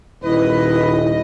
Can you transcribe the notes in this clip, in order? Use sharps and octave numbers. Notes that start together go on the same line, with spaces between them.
D#1 E4 B4 D#5